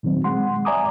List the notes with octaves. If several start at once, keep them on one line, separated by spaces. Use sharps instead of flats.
A#2 D#3 F#3 C4
G#3 F#5 C6
D5 E5 G#5 A#5 D6 D#6